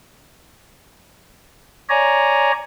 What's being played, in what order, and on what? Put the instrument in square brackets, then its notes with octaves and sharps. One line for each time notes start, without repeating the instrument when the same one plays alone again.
[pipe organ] C#5 D5 G#5 A#5